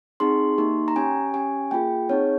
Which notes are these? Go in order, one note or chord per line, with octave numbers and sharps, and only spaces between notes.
C4 D#4 G#4 C6
A#3 D#4 G4
A#5
C#4 G4 G#5
C#4 G4 G#5
A#3 F4 G#4 G5
C4 D#4 G#4 C#5